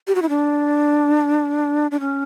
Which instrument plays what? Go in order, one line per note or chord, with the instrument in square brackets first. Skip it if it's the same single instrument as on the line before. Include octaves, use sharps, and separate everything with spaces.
[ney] G4
F#4
E4
D4
D4
C#4